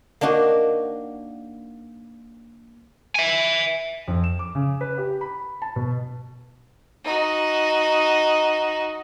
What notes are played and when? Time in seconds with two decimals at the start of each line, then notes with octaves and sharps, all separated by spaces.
0.21 A#3 D4 D#4 F#4
3.15 E5 G#5
4.08 F2
4.24 E7
4.39 D6
4.55 C#3
4.81 B4
4.98 G4
5.21 B5
5.62 A5
5.76 B2
7.04 D#4 F#4